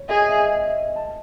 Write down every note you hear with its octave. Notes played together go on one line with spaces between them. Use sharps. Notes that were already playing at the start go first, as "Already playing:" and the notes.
Already playing: C#5
G#4 D#5
E5
D#5
E5
A5